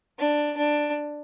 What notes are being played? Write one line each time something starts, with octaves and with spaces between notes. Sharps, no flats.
D4
D4